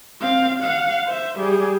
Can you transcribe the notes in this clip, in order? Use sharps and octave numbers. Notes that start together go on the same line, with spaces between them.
C4 F5
F5 F#5
C5 E5
G3 G#4